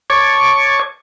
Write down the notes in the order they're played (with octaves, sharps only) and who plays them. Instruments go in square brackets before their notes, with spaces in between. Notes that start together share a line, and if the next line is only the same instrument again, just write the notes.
[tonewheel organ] C#5 A5 C#6 D6 G#6